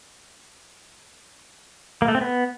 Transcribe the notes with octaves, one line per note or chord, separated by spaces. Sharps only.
A#3
A3
C4
B3